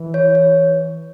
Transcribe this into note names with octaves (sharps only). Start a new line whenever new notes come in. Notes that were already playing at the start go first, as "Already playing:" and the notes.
Already playing: E3
C#5
C#5